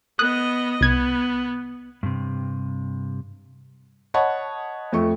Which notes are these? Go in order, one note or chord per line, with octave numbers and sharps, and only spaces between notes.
B3 D#5 D#6 F#6
C2 B3 G#6
G2 C3
C#5 D#5 F#5 A5 B5 C#6
F2 A3 C#6